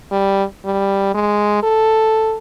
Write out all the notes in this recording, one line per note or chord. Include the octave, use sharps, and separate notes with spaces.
G3
G3
G#3
A4